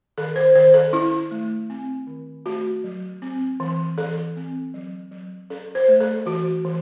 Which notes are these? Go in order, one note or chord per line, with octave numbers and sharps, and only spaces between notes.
D#3 A4
C5
D#3 C5
A4
C#4 E4
A3
C4
D#3
A3 F#4
F#3
C4
E3
E3 A4
C4
F#3
F#3
C#4 A4
C5
A3
A4
E3 F#4
E3